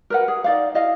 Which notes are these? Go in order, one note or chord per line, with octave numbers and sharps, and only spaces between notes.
A#4 B4 F#5
G#4
D#4 D5 F5
E4 D#5 F5